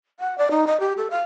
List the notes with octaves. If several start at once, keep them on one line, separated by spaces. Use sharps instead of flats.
F#5
D5
D#4
D#5
G4
A4
F5